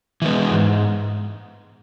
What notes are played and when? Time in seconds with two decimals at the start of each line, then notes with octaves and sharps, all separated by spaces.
0.22 E3 G#3 B3
0.51 G#2